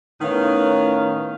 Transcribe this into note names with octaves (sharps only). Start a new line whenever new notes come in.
A2 D#3 B3 C#4 D#4 F5